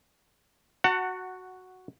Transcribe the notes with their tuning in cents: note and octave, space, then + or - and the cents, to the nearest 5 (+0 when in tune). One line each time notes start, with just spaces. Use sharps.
F#4 +0 F#5 +10 A5 +40